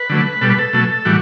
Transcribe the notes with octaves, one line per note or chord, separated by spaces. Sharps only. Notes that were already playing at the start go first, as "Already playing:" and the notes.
Already playing: B4
D3 F#3 A3
B2 G3 A4
B4
A4
B2 F#3 A3
A2 E3 G3 F#4